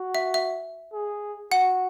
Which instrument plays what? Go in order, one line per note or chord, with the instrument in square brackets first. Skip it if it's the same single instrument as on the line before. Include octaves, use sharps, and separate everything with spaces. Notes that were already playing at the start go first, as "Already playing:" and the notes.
Already playing: [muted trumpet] F#4
[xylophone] E5
E5
[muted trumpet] G#4
[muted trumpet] F#4 [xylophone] F#5